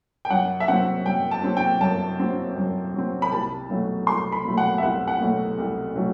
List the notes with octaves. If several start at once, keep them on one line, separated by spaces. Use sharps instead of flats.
G5
F#2 F#5
E5
F#3 C4 F#5
F#2 G5
A5
F#3 C4
G5
F#2 A5
F#3 C4
F#2
F#3 C4
B5
C2 A5
B2 F#3 A3
C2 C6
B5
B2 F#3 A3
F#5
E5
C2 F#5
F#5
B2 F#3 A3
C2
B2 F#3 A3